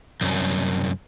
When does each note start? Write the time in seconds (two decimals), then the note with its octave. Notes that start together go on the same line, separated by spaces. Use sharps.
0.21 C2 F#2